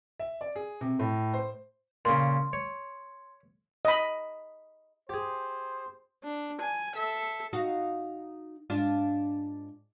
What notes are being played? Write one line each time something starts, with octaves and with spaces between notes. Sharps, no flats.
E5
D5
G#4
C3
A2
C5
A#2 C#3 C6
C#5
D#5 B5
G4 G#4 C5
D4
G#5
A4 E5
D#4 F#4 F5
G#2 D4 F4